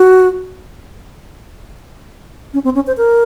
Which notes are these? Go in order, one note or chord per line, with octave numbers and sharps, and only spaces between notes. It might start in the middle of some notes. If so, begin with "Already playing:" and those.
Already playing: F#4
C#4
C4
C#4
C5
A#4